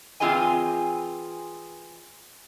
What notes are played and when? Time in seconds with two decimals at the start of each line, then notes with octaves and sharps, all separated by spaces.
0.20 E3 C4 F4 G#4 D#5 G#5